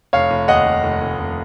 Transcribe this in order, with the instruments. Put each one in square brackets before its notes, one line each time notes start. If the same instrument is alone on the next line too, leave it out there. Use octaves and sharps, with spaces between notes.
[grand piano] F1 C#5 F5
F1
D#2 D#5 F#5
F1
F1
F1
F1